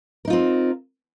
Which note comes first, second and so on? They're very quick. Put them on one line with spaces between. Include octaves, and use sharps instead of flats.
A#4 D#4 F4 C4